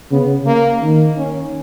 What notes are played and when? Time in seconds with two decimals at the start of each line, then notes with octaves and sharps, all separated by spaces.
0.11 C#3 B3
0.47 A#3
0.82 D#3
1.17 C#4